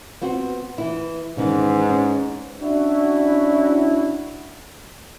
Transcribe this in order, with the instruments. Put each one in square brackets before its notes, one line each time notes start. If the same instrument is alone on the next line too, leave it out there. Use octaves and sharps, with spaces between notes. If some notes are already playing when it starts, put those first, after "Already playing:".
[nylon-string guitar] B3 C4 F#4
E3 E4
[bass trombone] G#2 [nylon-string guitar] D#3 E3 C#4
[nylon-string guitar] C#4
[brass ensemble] C#4 D4 E4 F#4